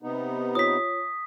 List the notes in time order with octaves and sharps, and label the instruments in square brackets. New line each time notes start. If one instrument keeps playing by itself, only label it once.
[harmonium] C3 B3 D#4
[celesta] F4 C#5 [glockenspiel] D#6 B6